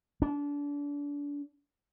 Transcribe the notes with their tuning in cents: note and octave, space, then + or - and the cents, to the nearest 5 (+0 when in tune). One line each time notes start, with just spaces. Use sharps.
D4 -30